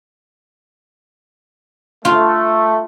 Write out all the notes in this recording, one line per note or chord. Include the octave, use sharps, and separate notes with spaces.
A3 F4